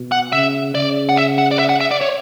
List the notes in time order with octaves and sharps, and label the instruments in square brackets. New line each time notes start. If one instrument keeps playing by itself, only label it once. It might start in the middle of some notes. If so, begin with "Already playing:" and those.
Already playing: [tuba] B2
[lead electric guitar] F#5
[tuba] C#3 [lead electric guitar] E5
[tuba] C#3 [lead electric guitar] D5
[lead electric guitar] F#5
E5
F#5
D5
E5
F#5
E5
D5
C#5